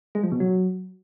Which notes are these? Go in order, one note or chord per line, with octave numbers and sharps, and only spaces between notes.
G#3
F3
B2
F#3